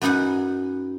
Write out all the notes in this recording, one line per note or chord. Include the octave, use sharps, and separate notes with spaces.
F#2 B3 D#4 F#5 G#5